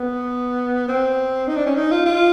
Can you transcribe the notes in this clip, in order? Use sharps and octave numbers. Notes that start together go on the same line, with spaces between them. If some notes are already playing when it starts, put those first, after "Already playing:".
Already playing: B3
C4
D#4
D4
C#4
D#4
F4
F4